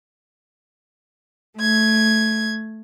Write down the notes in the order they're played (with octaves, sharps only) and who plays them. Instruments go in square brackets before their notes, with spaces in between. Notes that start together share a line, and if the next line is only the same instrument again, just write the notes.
[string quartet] A3 G#6